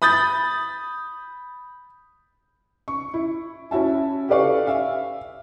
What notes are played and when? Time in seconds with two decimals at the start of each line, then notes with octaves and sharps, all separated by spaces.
0.02 B5 D#6 G6 A6
2.88 C#6
3.14 E4
3.71 C#4 E4 F#4 E5 A5
4.29 G4 A4 B4 D5 F5 C#6
4.67 E5 F5